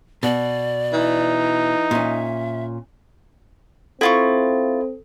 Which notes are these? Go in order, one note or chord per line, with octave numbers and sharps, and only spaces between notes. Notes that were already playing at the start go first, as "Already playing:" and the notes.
B2 D5
E3 D#4
A#2 C#4 E5
C4 E4 F4 A4 C#6